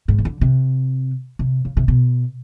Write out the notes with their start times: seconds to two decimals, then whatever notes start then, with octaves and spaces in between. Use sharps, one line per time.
0.08 G#2
0.18 C#3
0.25 D3
0.41 C3
1.39 C3
1.65 C#3
1.77 C3
1.88 B2